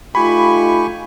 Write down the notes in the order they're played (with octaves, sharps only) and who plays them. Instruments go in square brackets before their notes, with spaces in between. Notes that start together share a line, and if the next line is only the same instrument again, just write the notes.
[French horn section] A3 D#4 F4 [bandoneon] G4 G#5 C#6 [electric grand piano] B5